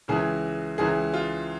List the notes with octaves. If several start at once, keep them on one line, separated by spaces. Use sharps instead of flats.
C#2 C#3 E3 G#4
C#2 C#3 E3 G#4
F4